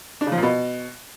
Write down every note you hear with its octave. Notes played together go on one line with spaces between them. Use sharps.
D4
C#3
F3
A#2
B2